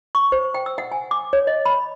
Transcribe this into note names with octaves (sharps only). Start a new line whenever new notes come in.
C#6
C5
G5
E6
F#5
G#5
D6
C#5
D#5
B5